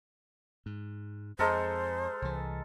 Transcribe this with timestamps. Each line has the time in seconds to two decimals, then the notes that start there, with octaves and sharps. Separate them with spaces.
0.66 G#2
1.39 F2 G#3 A4 A#4 C5
2.22 C2 E3